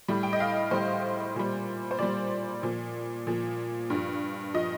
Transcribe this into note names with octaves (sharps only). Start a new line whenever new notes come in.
A2 G3
G5
D#5
F5
A2 G3 C5
A#2 G3
C5
A#2 G3 D5
A#2 F3
A#2 F3
G2 F3
F3 D#5